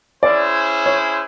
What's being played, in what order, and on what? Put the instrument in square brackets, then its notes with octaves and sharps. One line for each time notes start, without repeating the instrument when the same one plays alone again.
[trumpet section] C#4 E4 G#4 C5 [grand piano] D5
[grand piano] C#5